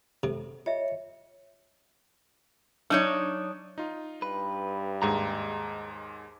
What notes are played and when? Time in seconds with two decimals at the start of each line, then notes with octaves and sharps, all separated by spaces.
0.23 C3 A4
0.66 F4 C#5 D#5 E5
2.90 F#3 D4 D#4 C#5
3.78 D#4 F4
4.22 G2 B4
5.02 D#2 G#2 G#3 G#4 D#5 A#5